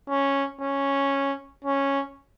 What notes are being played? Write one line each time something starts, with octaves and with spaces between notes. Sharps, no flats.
C#4
C#4
C#4